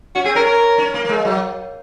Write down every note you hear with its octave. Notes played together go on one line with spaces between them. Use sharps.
C#4 F#4
C4 G#4
C#4 A#4
A#4
C#4
A#3
A#3
G#3
F#3